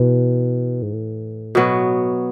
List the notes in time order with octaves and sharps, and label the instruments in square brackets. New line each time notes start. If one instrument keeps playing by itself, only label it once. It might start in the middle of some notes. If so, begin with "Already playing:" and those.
Already playing: [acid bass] B2 [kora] E3
[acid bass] G#2
A2
[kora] B2 F#3 B3